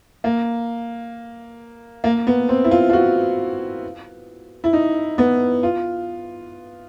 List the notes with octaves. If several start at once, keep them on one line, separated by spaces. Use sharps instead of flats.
A#3
A#3
B3
C4
E4
F4
F4
F#4
E4
D#4
B3
F4